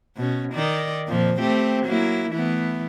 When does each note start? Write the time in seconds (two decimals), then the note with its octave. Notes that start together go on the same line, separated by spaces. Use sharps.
0.16 B2 C#4
0.53 D#3 D#4 D5
1.07 F2 A#2 F3
1.40 A3 C4 G4
1.85 F#3 A#3 E4
2.31 E3 A3 B3